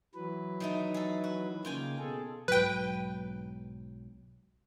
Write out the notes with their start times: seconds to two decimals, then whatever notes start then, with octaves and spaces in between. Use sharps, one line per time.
0.15 E3 F#3 B4
0.60 D#3 A3 D#4
0.94 G#4 A4
1.24 F#4
1.65 C#3 A#3 F4 G5 G#5
1.99 B2 G#4 A4
2.48 B1 G#2 F#3 B4 G5